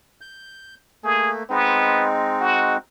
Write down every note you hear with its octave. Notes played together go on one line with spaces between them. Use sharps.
G6
A3 A#3 G#4
G#3 B3 C4 D#4
F#4